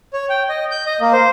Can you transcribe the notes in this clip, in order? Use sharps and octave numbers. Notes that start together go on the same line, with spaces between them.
C#5
G5
D#5
G6
D#5
A#3
C5